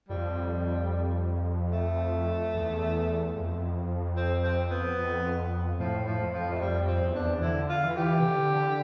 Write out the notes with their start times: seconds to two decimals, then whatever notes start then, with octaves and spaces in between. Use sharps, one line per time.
0.09 F2 G3
1.72 A3
2.54 E2
3.35 F2
4.16 C4
4.44 C4
4.71 B3
4.98 F2
5.79 A2 F3
6.06 F3
6.20 F2
6.33 F3
6.53 A3
6.61 F2 G3
6.88 C4
7.02 E2
7.15 D4
7.42 D3 E4
7.69 F4
7.83 E3
7.96 G4
8.20 C3
8.24 D3